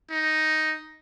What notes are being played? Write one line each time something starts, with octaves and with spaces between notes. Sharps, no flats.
D#4